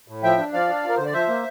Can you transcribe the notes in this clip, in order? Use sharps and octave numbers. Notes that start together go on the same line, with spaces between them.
A2
F3 E5 G5
D4
F3 D5 F5
D4
F3
A#4
D3 C5
D5
F3 C5 E5
A#3